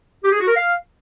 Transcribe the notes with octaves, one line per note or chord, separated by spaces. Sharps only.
G4
G#4
F#4
A#4
F5